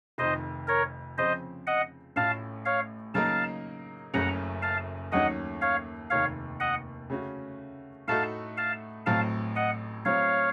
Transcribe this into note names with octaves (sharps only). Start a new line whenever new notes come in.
F1 F2 D#3 C5 D#5
A#4 C#5
C#3 F3 C4 C5 D#5
D#5 F#5
A1 A2 A3 C#4 F4 F5 A5
C#5 F5
C#3 F#3 A#3 D#4 A#4 F5 A5
F#1 F#2 C#3 A3 C#4 F#5 A#5
F5 A5
D#2 D#3 F#3 A3 C#4 D#5 F#5
C#5 F5
F1 D#2 D#3 C#5 F5
D#5 F#5
C#3 A3 C#4 F#4
A2 A3 D#4 F#4 A4 F5 A5
F5 A5
A1 A2 F#3 C4 F5 A5
D#5 F#5
A2 F#3 C4 C#5 F5